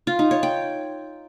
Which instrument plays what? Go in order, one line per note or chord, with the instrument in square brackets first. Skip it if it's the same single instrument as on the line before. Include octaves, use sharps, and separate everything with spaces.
[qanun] F4
D#4
C#5
G5